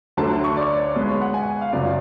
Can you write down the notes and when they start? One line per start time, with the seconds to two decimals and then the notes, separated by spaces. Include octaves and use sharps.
0.17 D2 D3 F#3 A3 D4 A5
0.44 C#6
0.57 D5
0.76 C#5
0.96 B1 B2 G#3 B3 B4
1.09 C#5
1.21 F#5
1.34 G#5
1.61 F5
1.73 F#1 F#2 C#3 F#3 B3 D5